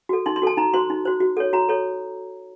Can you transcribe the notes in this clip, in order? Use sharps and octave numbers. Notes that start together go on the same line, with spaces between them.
F#4 A4
D#4 C6
C6
F#4 A4 A5
D#4 A#5
F#4 C5 C6
D#4
F#4 C5
F#4
A4 C#5
F#4 A#5
A4 C#5